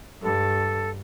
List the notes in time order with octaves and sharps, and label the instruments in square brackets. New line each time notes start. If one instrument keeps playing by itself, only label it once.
[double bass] G2 [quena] A4